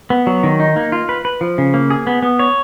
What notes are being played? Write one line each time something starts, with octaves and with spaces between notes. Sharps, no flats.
B3
F#3
D#3
D#4
A#3
F4
B4
B4
F3
C#3
A#3
G#4
B3
B3
C#5